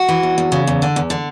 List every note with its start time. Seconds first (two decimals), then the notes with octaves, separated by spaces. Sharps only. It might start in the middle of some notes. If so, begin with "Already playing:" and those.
Already playing: F#4
0.09 E3
0.23 E2
0.38 E2
0.52 C#3
0.67 E2
0.82 D3
0.96 E2
1.10 D3